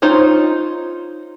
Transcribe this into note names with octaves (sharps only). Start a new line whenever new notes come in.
D#4 F4 C5 C#5